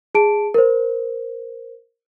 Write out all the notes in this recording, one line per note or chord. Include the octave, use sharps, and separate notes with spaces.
G#4 A5 D7
A#4 C5